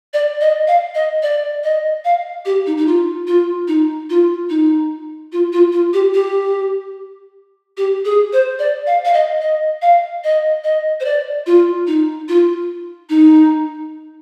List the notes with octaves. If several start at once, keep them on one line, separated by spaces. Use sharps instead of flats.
D5
D#5
F5
D#5
D5
D#5
F5
G4
D#4
D#4
F4
F4
D#4
F4
D#4
F4
F4
F4
G4
G4
G4
G#4
C5
D5
F5
F5
D#5
D#5
F5
D#5
D#5
C5
D5
F4
D#4
F4
D#4